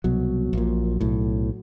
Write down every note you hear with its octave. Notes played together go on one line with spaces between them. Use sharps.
C2 B2 F#3
A#1 A#2
B1 A2